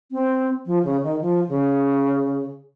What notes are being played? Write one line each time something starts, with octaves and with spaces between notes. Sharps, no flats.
C4
F3
C#3
D#3
F3
C#3